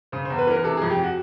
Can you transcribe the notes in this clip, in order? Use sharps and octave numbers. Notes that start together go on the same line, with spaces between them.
C#3 C5
C5
E2
B4
E3 A#4
C3 A4
G#4
F2
G4
F#4